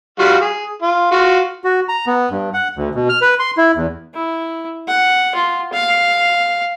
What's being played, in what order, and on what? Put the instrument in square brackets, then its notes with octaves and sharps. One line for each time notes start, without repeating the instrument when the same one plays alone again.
[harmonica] G3 F4 F#4
G#4
F4
F4 F#4
[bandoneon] F#4
A#5
B3
G2
F#5
D2
B2
F6
B4
C6
E4
E2
[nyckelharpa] E4
F#5
F4
F5